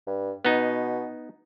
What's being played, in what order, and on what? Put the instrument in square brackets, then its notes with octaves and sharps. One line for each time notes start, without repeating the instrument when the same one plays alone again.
[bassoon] G2
[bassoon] B2 [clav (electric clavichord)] B3 D#4